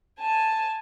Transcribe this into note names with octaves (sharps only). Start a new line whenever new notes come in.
G#5 A5